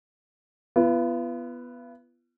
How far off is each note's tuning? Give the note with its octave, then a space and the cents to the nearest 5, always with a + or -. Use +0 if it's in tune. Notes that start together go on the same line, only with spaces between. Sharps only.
B3 +0 F4 -45